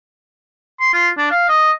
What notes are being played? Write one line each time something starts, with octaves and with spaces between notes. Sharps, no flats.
C6
F4
D4
F5
D#5